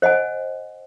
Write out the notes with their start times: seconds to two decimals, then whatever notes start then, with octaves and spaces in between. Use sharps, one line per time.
0.02 C5 D#5 F#5 G#5